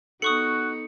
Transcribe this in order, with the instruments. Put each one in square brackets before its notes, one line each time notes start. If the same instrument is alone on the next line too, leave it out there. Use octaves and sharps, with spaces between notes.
[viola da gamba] B3 D#4 [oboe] F#4 [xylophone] A4 C#6 D#6 [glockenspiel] C#7